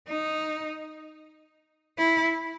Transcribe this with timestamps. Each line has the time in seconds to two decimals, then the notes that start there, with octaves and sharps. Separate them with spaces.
0.08 D#4
1.98 E4